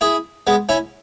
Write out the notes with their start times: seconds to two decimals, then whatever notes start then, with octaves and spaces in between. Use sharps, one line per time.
0.01 E4 G#4
0.47 G#3 B3
0.69 C#4 E4